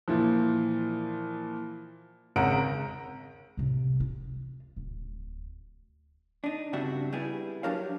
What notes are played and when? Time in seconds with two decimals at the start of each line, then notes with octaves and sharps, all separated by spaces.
0.08 A#2 E3 F3
2.36 G#1 C#3 F#5 A#5 D7
3.57 A2 C3
4.00 F4
4.76 D1
6.44 D4 D#4
6.73 G2 C#3 C4 D4 F#4 E5
7.12 G3 B3 E4 G#4
7.63 F#3 D4 G4 A#4 C#5 F5